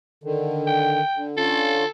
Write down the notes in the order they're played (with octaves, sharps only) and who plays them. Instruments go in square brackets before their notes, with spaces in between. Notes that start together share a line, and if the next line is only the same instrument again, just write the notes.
[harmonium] D3 D#3
[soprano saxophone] G5
[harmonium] D3
[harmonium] D3 C#4 F4 [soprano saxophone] A4